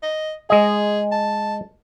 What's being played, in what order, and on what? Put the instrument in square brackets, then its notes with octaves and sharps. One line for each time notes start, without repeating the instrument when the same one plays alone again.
[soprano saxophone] D#5
[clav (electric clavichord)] G#3 D#5 [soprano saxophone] G#4
[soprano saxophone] A5